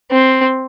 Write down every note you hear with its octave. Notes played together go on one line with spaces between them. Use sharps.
C4